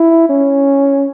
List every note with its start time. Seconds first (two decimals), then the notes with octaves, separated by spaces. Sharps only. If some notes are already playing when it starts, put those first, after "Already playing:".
Already playing: E4
0.29 C#4